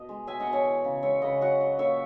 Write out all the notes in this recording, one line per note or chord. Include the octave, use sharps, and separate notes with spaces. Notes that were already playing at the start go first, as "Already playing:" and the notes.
Already playing: B2 D#5
G#3
B2 E5 G#5
D#5 F#5
B2
C#5 E5
E3
C#3
G#3 C#5 E5
C#3 B4 D#5
F#3 D#5 F#5
F#3
A#2 C#5 E5